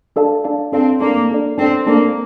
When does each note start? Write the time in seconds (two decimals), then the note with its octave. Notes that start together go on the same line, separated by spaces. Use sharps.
0.16 D4 A4 D5 F5 A5
0.44 D4 A4 D5 F5 A5
0.72 C4 D4 A4 D5 F5 A5
1.01 A#3 D4 A4 D5
1.30 D4 A4 D5
1.58 C4 D4 A4 D5
1.87 A#3 D4 A4 D5